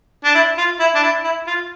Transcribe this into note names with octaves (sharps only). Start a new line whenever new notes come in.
D4
E4
F4
E4
D4
E4
E4
F4